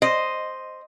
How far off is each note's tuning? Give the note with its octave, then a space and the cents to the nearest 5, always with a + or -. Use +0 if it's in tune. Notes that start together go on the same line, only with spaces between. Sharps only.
C5 +0 D#5 +0